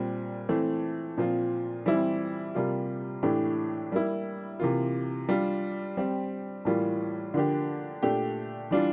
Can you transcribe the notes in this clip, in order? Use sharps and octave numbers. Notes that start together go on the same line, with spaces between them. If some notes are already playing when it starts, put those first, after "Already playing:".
Already playing: A#2 G3 C4
E3 A3 C4
A#2 F3 C4 F4
E3 G3 C4 E4
C3 G3 A#3 F4
A2 E3 A3 D4 G4
G3 A#3 E4
C3 E3 A#3 F4
G3 D4 F4
G3 C4 G4
A2 E3 G3 A#3 F4
D3 F3 A#3 D4 G4
A#2 A3 D4 G4
E3 G3 D4 F4